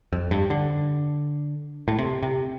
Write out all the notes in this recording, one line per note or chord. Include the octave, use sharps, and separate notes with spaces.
F2
G2
D3
A2
C3
C3